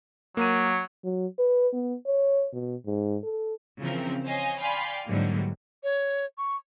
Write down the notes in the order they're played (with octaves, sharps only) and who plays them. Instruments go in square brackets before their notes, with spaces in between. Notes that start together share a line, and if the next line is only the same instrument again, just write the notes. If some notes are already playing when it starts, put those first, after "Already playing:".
[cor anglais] F#3 [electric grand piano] A#3 D#7
[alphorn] F#3
B4
B3
C#5
B2
G#2
A4
[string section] C#3 E3 F3 C4 A#4
C5 C#5 D#5 F5 G#5
D5 F5 G5 G#5 B5 C6
G#2 D3 E3 F#3 G3 A#3
[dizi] C#5
C#6